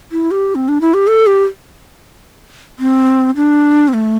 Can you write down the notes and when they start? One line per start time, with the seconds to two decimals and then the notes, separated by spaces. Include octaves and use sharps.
0.12 E4
0.31 G4
0.55 C4
0.68 D4
0.81 E4
0.94 G4
1.07 A4
1.27 G4
2.79 C4
3.36 D4
3.88 C4
3.94 A3